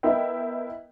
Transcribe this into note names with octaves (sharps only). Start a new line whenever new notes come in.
B3 E4 A#4 D#5 E5 G5